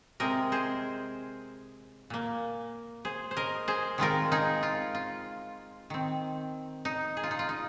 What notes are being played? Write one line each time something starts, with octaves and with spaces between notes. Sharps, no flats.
C3 G#3 C4 A#4 D#5
G#4 C5
A#2 A#3
G#4 C5
C5
A#4 D#5
G#4 C5
D#3 G#3 C4 F4 A#4
D#4 G#4
F4
F4
D#3 C4
D#4
G#4
F4
D#4
F4
D#4